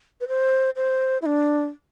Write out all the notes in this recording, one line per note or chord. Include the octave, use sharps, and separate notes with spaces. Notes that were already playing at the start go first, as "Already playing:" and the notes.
B4
C5
C5
E4
D4